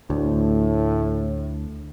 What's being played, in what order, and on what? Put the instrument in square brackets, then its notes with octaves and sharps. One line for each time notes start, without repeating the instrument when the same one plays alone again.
[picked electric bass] D2 [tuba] A2